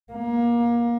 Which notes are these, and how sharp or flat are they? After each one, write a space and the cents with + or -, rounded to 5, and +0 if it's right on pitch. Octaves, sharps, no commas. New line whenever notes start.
A#3 +25